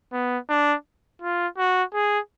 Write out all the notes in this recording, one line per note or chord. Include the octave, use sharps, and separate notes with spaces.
B3
D4
F4
F#4
G#4